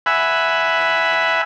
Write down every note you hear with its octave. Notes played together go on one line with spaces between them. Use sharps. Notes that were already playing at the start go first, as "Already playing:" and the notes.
E5 F#5 G#5 B5